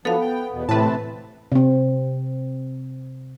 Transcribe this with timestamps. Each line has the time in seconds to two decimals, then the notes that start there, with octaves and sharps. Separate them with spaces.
0.05 F3 F#3 B3 D4 A4 F5
0.21 G5
0.52 E2 B2
0.69 A2 C3 E3 C4 B4 A5
1.52 C3 C4